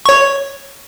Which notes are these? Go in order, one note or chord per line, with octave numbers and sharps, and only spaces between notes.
C#5 C#6